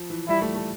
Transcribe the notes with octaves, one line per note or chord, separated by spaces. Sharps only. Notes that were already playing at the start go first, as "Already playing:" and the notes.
Already playing: F3
E3
G3 E4
A3
A3